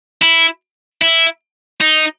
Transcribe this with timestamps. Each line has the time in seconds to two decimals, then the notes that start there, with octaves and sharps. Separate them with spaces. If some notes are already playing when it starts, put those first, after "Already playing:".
0.22 E4
1.02 E4
1.81 D#4